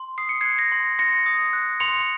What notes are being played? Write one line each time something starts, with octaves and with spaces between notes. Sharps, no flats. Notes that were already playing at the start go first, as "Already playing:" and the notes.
Already playing: C6
D#6 C7
C#7
F#6 G#6 C7
A#6
C6
C6 A#6 C#7
D#6
F#6
C6 C#7 F7